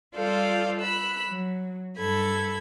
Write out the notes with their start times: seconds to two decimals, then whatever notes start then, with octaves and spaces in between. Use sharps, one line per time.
0.17 G3 F4 A4 C5 D5 F5
0.81 B5 E6 F#6
1.27 F#3
1.99 G2 A4 B5 G#6